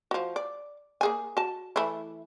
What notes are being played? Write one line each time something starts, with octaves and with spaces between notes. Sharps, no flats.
F3 F#4
D5
A#3 G#4 G#5
F#4 A5
E3 A3 E4